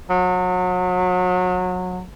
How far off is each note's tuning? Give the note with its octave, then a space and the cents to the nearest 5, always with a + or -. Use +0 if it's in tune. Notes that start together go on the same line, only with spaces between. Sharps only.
F#3 -30